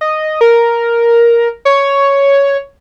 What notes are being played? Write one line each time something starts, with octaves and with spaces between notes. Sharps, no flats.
D#5
A#4
C#5